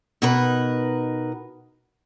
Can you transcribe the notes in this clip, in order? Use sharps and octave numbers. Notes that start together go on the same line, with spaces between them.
B2 D#4 A#4 B4